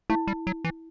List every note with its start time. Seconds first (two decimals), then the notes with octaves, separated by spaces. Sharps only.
0.10 A3 E4
0.27 G3
0.47 F#3
0.65 E3